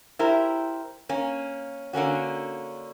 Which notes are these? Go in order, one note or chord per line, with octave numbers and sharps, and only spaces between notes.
E4 G4 A#4 C5
A#3 C#4
D3 A#3 C#4 F#4